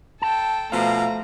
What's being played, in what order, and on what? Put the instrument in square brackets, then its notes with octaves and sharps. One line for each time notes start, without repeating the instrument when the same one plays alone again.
[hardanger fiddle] A4 G5 [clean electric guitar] A5
[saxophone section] B2 F3 F5 [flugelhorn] A3 [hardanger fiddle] A#5